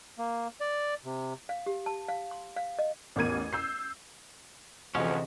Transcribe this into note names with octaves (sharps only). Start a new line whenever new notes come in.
A#3
D5
C3
F5
G4
A5
F5
C6
F5
D#5
A1 E2 A#4 G#6 D#7
E6 G6 C7
D2 C3 E3 F3 C#4 G#4 D#5 F#5